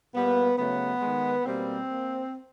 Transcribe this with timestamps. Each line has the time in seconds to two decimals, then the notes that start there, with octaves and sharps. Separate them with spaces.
0.15 A#2 G3 A#3 B3
0.58 C#3 F#3 A3 B3
1.01 D#3 G#3
1.45 B2 G3 A#3 C4
1.88 A#3